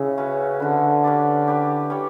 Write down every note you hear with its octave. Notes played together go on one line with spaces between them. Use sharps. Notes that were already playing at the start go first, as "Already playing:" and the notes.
Already playing: C#3 E4
C#4 F#4 B4
D3 C#4 F#4 B4
C#4 G4 B4 D5
C#4 G4 B4 D5
G3 C#4 G4 C#5